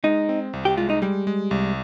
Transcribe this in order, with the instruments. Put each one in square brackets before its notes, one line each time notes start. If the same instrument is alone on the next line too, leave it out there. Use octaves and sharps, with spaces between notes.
[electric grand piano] G#3 [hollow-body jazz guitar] D#4
[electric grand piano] C4
C2
[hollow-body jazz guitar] G4
[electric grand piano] G#3 [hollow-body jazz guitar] F4
[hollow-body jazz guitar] D#4
[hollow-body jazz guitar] G3 [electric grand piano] G#3
[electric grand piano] G#3
C2